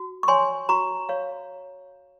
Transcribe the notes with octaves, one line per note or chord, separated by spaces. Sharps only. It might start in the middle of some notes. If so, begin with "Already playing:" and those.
Already playing: F#4
C#6
C#5 G#5 C6
F#4 A#5 C#6
C#5 F5